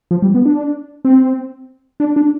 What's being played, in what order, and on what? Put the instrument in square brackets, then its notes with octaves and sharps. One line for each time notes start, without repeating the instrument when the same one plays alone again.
[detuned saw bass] F3
G3
B3
D4
C4
D4
D4